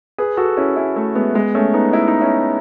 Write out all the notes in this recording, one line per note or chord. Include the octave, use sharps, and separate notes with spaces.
G#4 B4
F#4 A4
C#4 E4
C#4 E4
A3
G#3 B3
G#3 B3
A3 C#4
B3 D#4
E4
D#4
C#4 E4